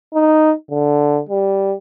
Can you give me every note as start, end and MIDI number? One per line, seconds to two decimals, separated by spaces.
0.14 0.52 63
0.70 1.20 50
1.29 1.74 55